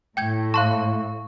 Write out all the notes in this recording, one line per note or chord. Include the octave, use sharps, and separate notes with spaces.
A2 G5 G6 G#6
F5 A5 C6 C#6 F#6